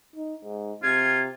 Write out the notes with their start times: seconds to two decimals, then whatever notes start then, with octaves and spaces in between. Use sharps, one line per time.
0.16 D#4
0.45 G#2
0.83 C3 F4 G#6